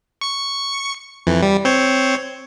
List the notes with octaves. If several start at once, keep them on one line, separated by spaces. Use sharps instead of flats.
C#6 C#7
F2 E3
G3
C4 C5 C#5